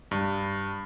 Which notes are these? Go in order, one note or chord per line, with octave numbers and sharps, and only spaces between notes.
G2